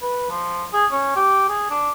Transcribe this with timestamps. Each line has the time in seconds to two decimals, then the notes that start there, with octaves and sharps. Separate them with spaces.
0.02 B4
0.30 F3
0.73 G#4
0.92 C#4
1.16 G4
1.49 G#4
1.70 D4